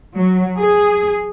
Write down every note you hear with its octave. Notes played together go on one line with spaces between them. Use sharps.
F#3
G#4